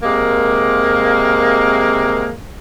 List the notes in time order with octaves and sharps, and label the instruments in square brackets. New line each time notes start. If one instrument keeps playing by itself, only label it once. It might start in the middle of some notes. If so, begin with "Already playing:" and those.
[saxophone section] C3 G#3 A#3